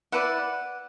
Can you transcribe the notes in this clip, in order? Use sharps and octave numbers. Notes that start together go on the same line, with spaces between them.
E4 B4 D5 F#5